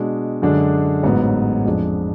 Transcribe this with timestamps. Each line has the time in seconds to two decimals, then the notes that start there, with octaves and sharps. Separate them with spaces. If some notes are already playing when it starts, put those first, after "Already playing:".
Already playing: B2 G#3 D4
0.42 F#2 D3 G#3 D4
1.03 A1 G#2 F#3 B3
1.65 F2 F3 G#3 D4